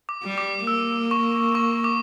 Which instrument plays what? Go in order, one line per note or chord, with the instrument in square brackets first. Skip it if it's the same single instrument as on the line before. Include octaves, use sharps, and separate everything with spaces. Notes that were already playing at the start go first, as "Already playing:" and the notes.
[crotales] D6
[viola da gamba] G3
[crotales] D6
[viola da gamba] A#3 [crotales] E6
[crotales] C#6
C#6
D6